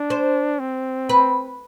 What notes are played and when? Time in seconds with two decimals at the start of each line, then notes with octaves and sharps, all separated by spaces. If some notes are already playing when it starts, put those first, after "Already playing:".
Already playing: D4
0.10 C5
0.59 C4
1.09 B4